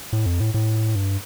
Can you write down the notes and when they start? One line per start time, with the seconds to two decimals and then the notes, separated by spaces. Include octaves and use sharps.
0.13 A2
0.26 F2
0.40 A2
0.54 A2
0.95 G2